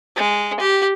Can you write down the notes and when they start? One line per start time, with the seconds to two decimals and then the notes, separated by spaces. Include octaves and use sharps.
0.16 G#3
0.60 G4